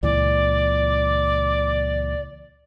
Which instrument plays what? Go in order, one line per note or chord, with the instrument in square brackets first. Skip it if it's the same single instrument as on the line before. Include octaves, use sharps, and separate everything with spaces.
[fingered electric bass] C#2 A#2 E3 [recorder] D5